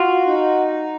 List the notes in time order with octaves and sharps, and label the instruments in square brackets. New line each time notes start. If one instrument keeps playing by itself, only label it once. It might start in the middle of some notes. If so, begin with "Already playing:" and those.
Already playing: [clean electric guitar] F4 [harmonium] F#4
[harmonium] D#4